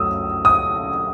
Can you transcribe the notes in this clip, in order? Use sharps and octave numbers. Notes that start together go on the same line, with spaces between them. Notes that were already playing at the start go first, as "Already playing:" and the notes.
Already playing: F#2 F#3 A3 D#6 E6
D#6